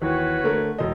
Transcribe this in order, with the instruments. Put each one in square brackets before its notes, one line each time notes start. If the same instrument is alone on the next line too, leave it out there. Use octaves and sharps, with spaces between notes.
[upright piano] D#2 E3 [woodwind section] F#4 B4 C#5
[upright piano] D3 A3 A#4
E1 D#5